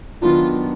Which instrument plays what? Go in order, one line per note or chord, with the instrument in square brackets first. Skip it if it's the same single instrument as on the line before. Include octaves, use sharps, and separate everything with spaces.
[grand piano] D#3 F#3 B3 D4 [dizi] F4